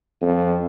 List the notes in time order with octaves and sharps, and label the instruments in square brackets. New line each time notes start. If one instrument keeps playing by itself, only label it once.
[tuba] F2